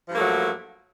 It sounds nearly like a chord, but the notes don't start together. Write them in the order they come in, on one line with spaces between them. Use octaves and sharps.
F3 G2 A#3 A3 F#3